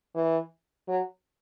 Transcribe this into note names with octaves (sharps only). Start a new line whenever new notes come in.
E3
F#3